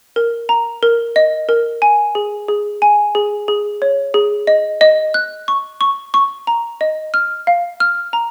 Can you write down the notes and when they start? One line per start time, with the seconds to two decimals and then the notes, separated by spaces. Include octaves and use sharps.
0.16 A#4
0.49 A#5
0.83 A#4
1.16 D#5
1.49 A#4
1.82 G#5
2.15 G#4
2.48 G#4
2.82 G#5
3.15 G#4
3.48 G#4
3.82 C#5
4.14 G#4
4.47 D#5
4.81 D#5
5.14 F#6
5.48 C#6
5.81 C#6
6.14 C#6
6.47 A#5
6.81 D#5
7.14 F6
7.47 F5
7.80 F6
8.13 A#5